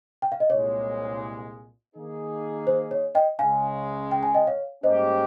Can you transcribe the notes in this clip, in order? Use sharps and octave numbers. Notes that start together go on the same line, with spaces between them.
G5
F5
D#5
C2 A#2 G#3 C#5
D#3 A#3 D#4 G#4
C5
C#5
D#5 G5
C#2 C#3 G#3 F5 G#5
G5
G#5
D#5 G5
C#5 F5
G#2 G3 A#3 C#4 G4 C5 D#5